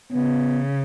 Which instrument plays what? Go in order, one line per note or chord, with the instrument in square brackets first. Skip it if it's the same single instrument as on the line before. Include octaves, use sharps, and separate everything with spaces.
[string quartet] C#3 [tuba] B3